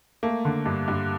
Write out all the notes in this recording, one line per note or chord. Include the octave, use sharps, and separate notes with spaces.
A3 A#3
D3
G2
G2